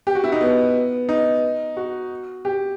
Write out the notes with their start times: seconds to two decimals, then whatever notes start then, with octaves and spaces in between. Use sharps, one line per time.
0.07 G4
0.15 F#4
0.24 E4
0.32 D#4
0.41 B3
1.09 D#4
1.77 F#4
2.45 G4